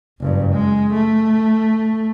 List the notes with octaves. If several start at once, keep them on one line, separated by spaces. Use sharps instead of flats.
F#1 G2
G#3
A3